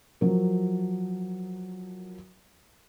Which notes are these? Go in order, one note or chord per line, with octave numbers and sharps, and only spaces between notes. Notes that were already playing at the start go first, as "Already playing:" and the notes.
F3 F#3 A#4